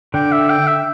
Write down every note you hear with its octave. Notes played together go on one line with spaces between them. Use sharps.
D3 D4 G5
E5
G5
E5